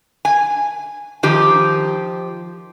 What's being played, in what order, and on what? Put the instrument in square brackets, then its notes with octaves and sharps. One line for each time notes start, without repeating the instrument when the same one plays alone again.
[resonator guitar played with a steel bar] G#5
D#3 F3 G4